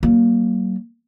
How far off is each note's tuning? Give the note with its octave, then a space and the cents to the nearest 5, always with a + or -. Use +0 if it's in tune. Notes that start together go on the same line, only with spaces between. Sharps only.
F#3 +45 A#3 +0